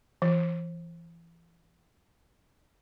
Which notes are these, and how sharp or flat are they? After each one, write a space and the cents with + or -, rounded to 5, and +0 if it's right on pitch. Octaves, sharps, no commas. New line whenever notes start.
E3 +30